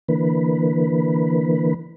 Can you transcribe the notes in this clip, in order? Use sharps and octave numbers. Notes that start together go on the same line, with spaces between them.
D3 E3 A#3 B4